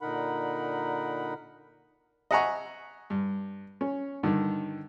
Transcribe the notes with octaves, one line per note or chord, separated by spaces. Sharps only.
A#2 D3 D#4 A#4 F#5 B5
D#5 E5 F#5 G#5 A#5 C#6
G2
C#4
G2 D3 D#3